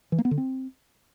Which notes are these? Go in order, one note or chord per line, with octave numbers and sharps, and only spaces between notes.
E3
A#3
B3
D3
C4